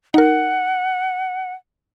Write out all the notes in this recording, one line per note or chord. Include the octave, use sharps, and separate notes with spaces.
D#4 A#4 F#5